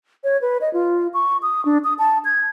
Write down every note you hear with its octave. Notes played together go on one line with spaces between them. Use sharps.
C#5
B4
D#5
F4
C#6
D#6
D4
D#6
A5
G#6